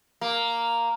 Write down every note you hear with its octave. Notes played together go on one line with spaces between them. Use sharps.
A#3